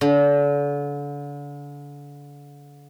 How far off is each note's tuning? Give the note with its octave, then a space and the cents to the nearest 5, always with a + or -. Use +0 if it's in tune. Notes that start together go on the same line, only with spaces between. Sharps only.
D3 -35